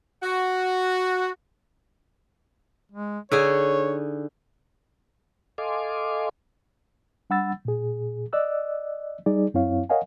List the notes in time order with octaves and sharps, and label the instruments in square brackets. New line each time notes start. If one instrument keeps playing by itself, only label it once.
[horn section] F#4
[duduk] G#3
[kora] D3 D#4 G#4 [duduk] C#5
[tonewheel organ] A4 D#5 F5 G#5 C6 D6
[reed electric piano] G3 D4 F#5 B5 E6 A6
A#2 G#4
D5 D#5 E6 F#6
G3 D#4 G#4 D5
F#2 C4 E4 C#5 F5
A#4 C#5 D#5 F5 F#5 G#5